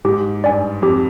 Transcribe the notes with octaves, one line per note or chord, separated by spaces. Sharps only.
G#2 G4
G2 D5 G#5
F2 G4